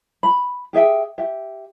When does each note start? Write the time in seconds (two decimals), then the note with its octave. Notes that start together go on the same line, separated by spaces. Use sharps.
0.23 B5
0.73 G4 G#4 E5 G5
1.18 G4 E5